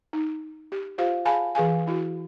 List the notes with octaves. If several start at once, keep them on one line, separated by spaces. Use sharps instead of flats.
D#4
G4
F4 G4 C5 F5
G#4 F5 G#5 A5 B5
E3 G#4 F5 G#5
E4 F#4